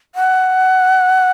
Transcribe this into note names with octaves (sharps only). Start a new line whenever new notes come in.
F#5